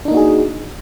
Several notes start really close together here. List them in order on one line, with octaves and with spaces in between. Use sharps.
D4 D#4 A#3 F#4 G#4